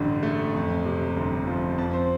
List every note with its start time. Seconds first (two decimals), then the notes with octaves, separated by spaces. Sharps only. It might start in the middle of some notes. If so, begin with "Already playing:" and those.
Already playing: A1 G2 D3
0.23 A3
0.54 F2
0.86 C3
1.16 G1
1.47 F3
1.78 F2 A5
1.93 C5